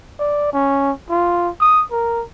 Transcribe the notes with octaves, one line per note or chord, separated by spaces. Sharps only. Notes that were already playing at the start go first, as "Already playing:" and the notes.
D5
C#4
F4
D#6
A#4